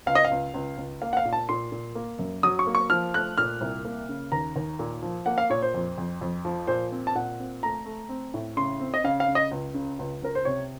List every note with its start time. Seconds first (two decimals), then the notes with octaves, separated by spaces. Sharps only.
0.06 C#2 F5
0.15 D#5
0.25 F5
0.31 C#2
0.54 C#2
0.77 C#2
1.02 A#3 F5
1.13 F#5
1.17 F5
1.25 A#2
1.33 A5
1.49 A#2 C6
1.72 A#2
1.95 A#3
2.19 F#2
2.43 F#3 D#6
2.59 C#6
2.67 A#3
2.75 C#6
2.90 F3 F6
3.14 A3 F#6
3.38 A#2 F6
3.61 C2
3.85 A#3
4.09 C#3
4.32 D#2 A#5
4.56 D#2
4.79 A#2
5.03 F3
5.26 A#3 F#5
5.38 F5
5.50 A#2 C#5
5.62 C5
5.74 F2
5.98 F2
6.21 F2
6.45 F3
6.67 A#2 C5
6.92 C4
7.07 A5
7.15 A#2 F#5
7.39 C4
7.63 A3 A#5
7.85 A3
8.09 C4
8.34 A2
8.57 C#3 C6
8.80 C4
8.94 D#5
9.04 C#3 F5
9.20 F5
9.28 C#3
9.35 D#5
9.51 C#2
9.74 C#3
9.99 C#2
10.22 C#2 A#4
10.35 C5
10.45 C3 C#5